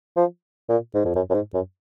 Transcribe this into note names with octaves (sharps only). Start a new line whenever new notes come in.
F3
A#2
G#2
F2
F#2
F#2
G#2
F#2